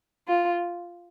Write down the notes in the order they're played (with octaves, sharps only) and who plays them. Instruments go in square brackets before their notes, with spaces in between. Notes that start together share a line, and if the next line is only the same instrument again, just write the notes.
[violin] F4